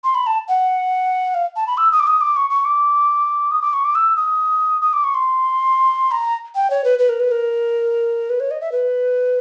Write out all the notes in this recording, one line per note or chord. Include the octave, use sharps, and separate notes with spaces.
C6
B5
A5
F#5
F5
A5
B5
E6
D#6
D6
D#6
D6
C#6
C#6
D6
D#6
D6
C#6
D6
E6
D#6
D#6
D6
C#6
C6
A#5
G5
C#5
B4
B4
A#4
B4
A#4
B4
C#5
D#5
E5
B4